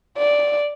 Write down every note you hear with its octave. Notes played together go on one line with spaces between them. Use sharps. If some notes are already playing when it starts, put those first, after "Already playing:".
D5